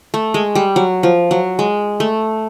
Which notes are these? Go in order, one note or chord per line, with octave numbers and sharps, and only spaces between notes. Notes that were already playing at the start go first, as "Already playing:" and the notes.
A3
G#3
G3
F#3
F3
F#3
G#3
A3